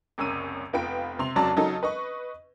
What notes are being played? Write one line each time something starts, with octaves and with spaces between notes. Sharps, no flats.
F#1 C2 C#4 E6 D#7
F1 B3 F4 G5 B5 D7
C3 C6 F7
F1 C#3 F#3 D5 A5
C#3 F#3 D#4 A4
B4 D#5 C#6